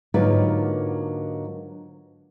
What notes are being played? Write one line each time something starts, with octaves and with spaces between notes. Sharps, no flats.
G#2 D3 F#3 A#3 F4 B4